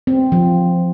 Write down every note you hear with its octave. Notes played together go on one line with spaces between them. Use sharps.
C4
F3